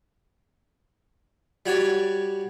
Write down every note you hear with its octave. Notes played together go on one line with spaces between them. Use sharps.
G3 F#4 C#5 D5